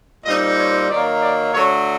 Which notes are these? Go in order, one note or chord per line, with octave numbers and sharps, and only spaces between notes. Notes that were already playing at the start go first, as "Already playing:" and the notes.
A#2 G3 C4 D#4 D#5
C#5
D#3 F#3 A#3 D5
D5
D3 F#3 A3 C#5